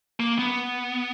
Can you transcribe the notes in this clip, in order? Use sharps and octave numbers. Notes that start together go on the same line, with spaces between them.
A#3
B3